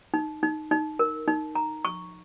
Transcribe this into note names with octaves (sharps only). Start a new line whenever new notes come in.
D#4
D#4
D#4
A#4
D#4
A#5
C#6